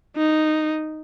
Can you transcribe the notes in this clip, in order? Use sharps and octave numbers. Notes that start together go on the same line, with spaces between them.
D#4